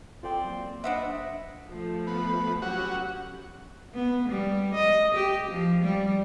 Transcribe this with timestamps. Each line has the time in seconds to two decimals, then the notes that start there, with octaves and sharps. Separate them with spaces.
0.23 C4 F4 A4 C5 D5 G5
0.45 F#3 A#3
0.84 D4 C5 D#5 E5 F#5 B5
1.68 F3 A3
2.07 B3
2.62 F#3 C#4 F#4 G4
3.95 B3
4.30 G3
4.75 D#5
5.15 G4
5.51 F3
5.83 G3